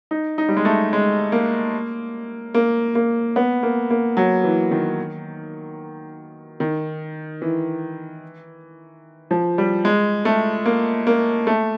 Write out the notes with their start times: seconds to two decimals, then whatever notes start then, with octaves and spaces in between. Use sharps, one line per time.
0.11 D#4
0.38 D#4
0.48 G3
0.57 G#3
0.65 A3
0.93 G#3
1.32 A#3
2.54 A#3
2.95 A#3
3.36 B3
3.63 A#3
3.90 A#3
4.17 F#3
4.44 E3
4.71 D#3
6.60 D#3
7.42 E3
9.31 F3
9.58 G3
9.85 G#3
10.25 A3
10.66 A#3
11.07 A#3
11.47 A3